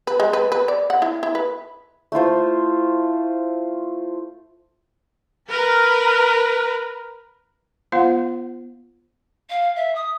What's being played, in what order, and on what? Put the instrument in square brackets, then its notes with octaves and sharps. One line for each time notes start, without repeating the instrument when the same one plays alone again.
[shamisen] B4
G#3
B4
B4
D5
F#5
E4
E4
B4
[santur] A3 E4 F4 C5
[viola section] A#4 B4
[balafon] B3 F4 C5 F5 F#5
[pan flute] F5
E5
D#6